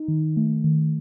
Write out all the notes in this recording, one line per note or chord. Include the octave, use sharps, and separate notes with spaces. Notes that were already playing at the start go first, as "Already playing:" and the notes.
Already playing: D#4
D#3
A3
D#3